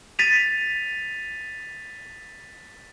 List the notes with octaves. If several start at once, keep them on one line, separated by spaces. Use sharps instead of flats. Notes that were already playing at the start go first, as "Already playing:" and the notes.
A6 B6 D#7 F7